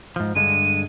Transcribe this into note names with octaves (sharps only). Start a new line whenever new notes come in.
G#2 F3
G2 D3 G#3 D#7